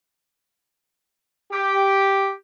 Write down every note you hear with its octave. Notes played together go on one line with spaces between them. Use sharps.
G4